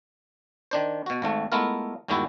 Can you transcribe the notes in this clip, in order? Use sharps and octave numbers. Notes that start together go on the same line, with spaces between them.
D#3 D4 C5
B2 F#4
G#1 G#2 A3
G#3 A3 B3 E4 F4 A#4
G1 D#2 D#3 G#3 E4 F#4